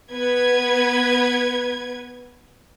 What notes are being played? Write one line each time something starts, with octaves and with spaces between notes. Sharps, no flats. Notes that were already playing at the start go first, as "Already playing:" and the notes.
B3 B4 G#6